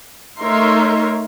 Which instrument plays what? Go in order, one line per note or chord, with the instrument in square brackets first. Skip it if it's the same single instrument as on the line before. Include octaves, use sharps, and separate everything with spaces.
[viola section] A3 D#4 A#4 C#5 E5 C6